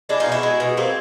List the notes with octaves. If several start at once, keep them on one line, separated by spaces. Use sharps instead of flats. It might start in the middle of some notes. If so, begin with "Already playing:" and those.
G#3 D4 E4
D#4 F4
B2
E4 F#4
G#3
B2
G#3 A#3 C4